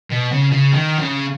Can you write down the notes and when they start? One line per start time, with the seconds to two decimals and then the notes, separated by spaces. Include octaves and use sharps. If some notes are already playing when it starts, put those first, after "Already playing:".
0.10 B2
0.32 C#3
0.52 C#3
0.72 D#3
0.98 C#3